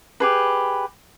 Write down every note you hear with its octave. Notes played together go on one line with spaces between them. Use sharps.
G4 G#4 B4